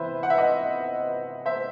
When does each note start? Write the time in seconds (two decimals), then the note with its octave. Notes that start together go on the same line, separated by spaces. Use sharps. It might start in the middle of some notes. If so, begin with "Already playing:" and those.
Already playing: C3 E3 B3 B4 C5 E5
0.23 F#5
0.30 E5
0.38 D#5 F#5
1.46 C5 E5